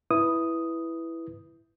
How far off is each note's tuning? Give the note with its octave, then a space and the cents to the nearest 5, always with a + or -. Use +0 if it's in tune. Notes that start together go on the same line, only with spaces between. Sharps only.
E4 +0 B4 +0 D#6 +0